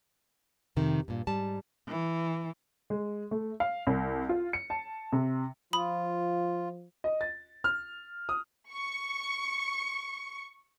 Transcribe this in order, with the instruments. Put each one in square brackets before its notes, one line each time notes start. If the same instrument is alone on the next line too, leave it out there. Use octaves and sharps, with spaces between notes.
[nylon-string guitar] F2 C3 D#3
G2 A#2
G#2 G3 A5
[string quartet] E3
[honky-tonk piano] G#3
A3
F5
C2
F4
C#7
A5
C3
[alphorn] F3 [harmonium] F4 [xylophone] B5 D#6
[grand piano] D#5
A6
F6
D#6
[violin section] C#6 C#7